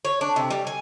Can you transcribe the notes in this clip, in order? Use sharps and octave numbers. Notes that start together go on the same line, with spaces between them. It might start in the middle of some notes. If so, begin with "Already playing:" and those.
C#5
D4
C3
G3
G#5